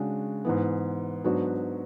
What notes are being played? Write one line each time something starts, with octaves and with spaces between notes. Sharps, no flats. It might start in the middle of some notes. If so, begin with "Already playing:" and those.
Already playing: C#3 G#3 D4 F#4
G#2 E3 B3
G#2 F#3 B3 D4 F#4